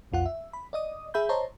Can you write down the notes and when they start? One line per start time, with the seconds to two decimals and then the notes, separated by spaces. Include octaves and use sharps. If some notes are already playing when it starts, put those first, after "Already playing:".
0.12 B1 F2 F4 F#5
0.26 E5
0.53 B5
0.73 D5 D#5 D#6
1.14 G#4 E5 B5 G6
1.29 C5 C#5 D#5 A5 A#5 C6